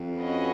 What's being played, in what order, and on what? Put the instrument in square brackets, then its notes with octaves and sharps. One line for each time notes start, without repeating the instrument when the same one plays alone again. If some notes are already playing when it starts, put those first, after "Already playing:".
Already playing: [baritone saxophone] F2
[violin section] C#4 F#4 B4 D#5